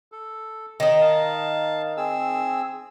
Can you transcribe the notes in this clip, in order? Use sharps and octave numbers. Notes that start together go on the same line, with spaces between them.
A4
D#3 D#4
F5 A5
C4 G#4 E6